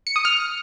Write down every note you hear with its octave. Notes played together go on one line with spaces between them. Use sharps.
C#7
D#6
F6